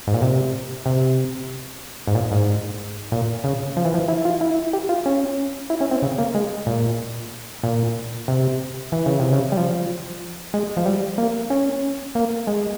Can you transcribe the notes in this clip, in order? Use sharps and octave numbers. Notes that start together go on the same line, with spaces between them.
G#2
A#2
C3
C3
G#2
A#2
G#2
A#2
C#3
F3
E3
F3
E4
F4
E4
G4
F4
C#4
E4
C#4
C4
C#3
A#3
G#3
A#2
A#2
C3
E3
C#3
C3
C#3
G3
F3
G#3
F3
G3
A#3
C#4
A#3
G#3